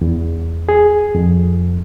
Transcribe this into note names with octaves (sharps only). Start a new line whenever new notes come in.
E2
G#4
F2